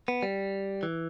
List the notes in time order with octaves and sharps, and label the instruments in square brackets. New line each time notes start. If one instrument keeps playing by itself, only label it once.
[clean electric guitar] B3
G3
E3